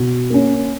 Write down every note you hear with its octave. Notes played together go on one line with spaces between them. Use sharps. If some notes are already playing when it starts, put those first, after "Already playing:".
Already playing: B2
A#3 C#4